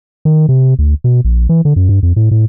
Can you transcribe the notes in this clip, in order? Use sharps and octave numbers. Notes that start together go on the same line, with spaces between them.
D#3
C3
D2
B2
A#1
E3
D3
F#2
G2
F2
A2
A2